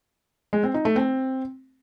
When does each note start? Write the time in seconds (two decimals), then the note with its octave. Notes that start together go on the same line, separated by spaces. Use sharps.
0.53 G#3
0.64 C4
0.74 D#4
0.85 A3
0.96 C4